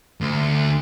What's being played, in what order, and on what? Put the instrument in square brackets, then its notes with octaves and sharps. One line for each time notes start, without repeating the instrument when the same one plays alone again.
[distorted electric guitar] D2